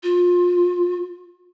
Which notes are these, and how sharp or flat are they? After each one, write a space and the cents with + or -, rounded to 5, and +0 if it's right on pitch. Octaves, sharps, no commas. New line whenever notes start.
F4 +25